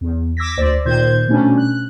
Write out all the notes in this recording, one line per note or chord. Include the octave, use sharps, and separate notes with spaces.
E2
D6 E6 G#6 A#6 B6
D2 C5 D5
A#2 D#3 C5 G6 G#6
B2 G3 A3 C#4 D4
F#6